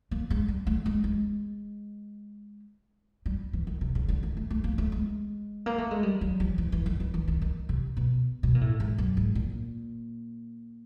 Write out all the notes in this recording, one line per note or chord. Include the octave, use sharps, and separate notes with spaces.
A#3
G#3
G3
A3
G#3
G#3
G3
E3
D#3
C3
C#3
D3
D#3
A3
A3
A#3
A3
G#3
A#3
A3
G#3
G3
F#3
F3
E3
E3
D#3
E3
E3
D#3
D#3
C3
B2
B2
A#2
A2
G#2
F#2
G#2
A#2